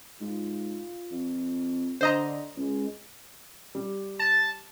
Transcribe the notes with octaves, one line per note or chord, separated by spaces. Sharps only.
G#2 F4
F2
D3 D4 C5 D#5 A#5
C#2 G#3
G3
A5